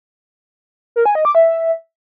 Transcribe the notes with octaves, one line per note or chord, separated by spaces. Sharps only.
A#4
G#5
D#5
D6
E5